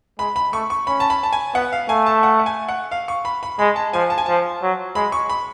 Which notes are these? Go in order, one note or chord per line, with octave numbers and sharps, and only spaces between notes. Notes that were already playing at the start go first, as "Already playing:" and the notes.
G#3 B5
B5
A3 C#6
C#6
C#4 B5
A5
B5
A5
G#5
B3 F#5
F5
A3 G#5
A5
F#5
F#5
G#5
F#5
F5
C#6
B5
B5
G#3 B5
A5
F3 G#5
A5
G#5
F3 A5
F#3
G#3 B5
C#6
B5